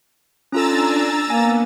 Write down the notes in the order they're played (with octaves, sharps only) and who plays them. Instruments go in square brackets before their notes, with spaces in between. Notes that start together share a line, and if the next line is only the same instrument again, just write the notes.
[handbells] C#4 F4 A4 [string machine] D4 G#5 [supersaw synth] A#5 E6 A6
[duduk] A#3 [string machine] B3 [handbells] G#5